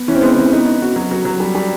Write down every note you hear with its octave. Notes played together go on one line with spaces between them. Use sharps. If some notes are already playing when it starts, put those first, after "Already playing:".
Already playing: B3
E3 C#4
C4
G#3 B3
C4
E3
B3 D#4
D#4
F#4
F#3
F#3
F#3
G3
G3